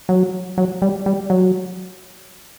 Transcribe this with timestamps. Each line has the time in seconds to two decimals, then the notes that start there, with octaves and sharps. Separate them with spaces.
0.09 F#3
0.58 F#3
0.82 G3
1.06 G3
1.30 F#3